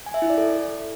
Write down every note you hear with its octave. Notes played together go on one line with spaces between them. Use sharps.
G#5
E5
E4
D5
A4